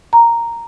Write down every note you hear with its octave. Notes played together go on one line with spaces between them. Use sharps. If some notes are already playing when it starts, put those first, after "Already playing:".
A#5